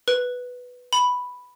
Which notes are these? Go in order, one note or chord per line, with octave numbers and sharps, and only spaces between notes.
B4
B5